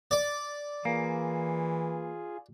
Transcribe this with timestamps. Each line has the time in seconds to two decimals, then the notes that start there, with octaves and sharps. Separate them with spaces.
0.11 D5
0.85 E3 A#3 F4 G#4